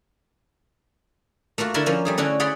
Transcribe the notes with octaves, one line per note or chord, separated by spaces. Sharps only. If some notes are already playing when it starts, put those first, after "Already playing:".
A3 A#3 F4 F#4
D3 E4 A#4 E5 A5 C6
F3 A#3 C#4
G3 A3 G#4
D3 C#4 D4 E4 F#4
G#4 C#5 D5 F#5 B5 C6